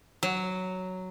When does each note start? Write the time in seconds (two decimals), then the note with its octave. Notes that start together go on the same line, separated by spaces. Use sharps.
0.23 F#3